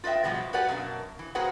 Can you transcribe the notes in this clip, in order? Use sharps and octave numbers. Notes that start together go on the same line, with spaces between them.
F4 B4 D#5 E5 G5
B2 F3 G3 G#3 B3
F#4 G4 B4 D5 F#5 G#5
F#2 B2 A#3 D4
E3
A#3 F#4 G#4 B4 C5 F#5